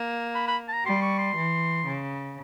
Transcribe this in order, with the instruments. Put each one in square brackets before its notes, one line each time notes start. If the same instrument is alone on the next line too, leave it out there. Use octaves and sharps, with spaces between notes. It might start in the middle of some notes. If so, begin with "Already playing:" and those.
Already playing: [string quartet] A#3
[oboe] B5
B5
A5
A#5
[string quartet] G3 [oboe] C6
[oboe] C#6
C6
[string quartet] E3
C#3